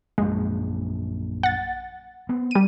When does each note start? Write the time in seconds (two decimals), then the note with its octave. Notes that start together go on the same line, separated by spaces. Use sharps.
0.18 A#1 F#2 G#3
1.43 F#5 A6
2.29 B3 C4
2.51 G3 D#7